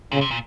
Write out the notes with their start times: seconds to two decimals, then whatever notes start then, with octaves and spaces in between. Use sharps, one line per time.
0.12 A#2 C#3
0.21 C3
0.31 A#2